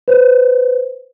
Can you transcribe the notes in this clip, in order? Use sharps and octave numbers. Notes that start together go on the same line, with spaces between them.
B4 C5